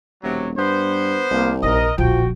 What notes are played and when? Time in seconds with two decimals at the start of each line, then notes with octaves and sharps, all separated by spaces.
0.23 E1 C3 F#3
0.57 G2 B3 C5
1.31 C2 A#3
1.63 A#1 D#4 A#4 D#5
1.98 D1 A#1 F3 F#4 G5